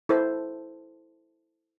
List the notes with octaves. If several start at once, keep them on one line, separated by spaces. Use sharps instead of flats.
E4 A4 C5